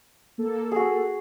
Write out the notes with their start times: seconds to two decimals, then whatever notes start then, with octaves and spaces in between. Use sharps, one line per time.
0.38 A#3 A4
0.71 F#4 G#4